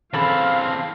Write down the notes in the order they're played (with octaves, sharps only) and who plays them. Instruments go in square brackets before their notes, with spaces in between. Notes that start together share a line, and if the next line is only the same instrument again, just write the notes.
[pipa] C#3 A4 B5 [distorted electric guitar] E3 C4 [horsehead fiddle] F5